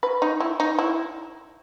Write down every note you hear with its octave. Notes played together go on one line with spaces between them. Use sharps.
B4
D#4
E4
D#4
E4